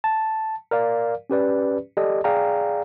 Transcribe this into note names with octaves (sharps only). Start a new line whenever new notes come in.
A5
A#4 D5 F5
C#4 G4 B4 D5
G4 A4 D5 D#5
G#4 D5 F5 G5 A#5